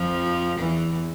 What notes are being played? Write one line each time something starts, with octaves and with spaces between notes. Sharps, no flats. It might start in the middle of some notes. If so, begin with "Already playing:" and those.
Already playing: F2 F3
E2 E3